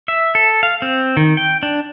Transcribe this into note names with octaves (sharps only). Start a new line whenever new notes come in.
E5
A4
F5
C4
D#3
G5
D4